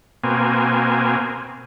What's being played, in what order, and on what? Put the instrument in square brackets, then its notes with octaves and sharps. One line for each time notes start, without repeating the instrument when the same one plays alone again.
[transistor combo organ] B2 A#3 C4 G#5